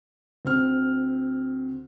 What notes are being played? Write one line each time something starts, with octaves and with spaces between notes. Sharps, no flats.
D2 C4 F6